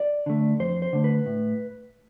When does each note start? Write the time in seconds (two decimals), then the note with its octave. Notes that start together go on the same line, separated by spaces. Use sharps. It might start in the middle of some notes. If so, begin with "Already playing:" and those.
Already playing: D5
0.26 D3 A3
0.60 F2 C5
0.82 C5
0.93 D3 A3
1.04 B4
1.26 A2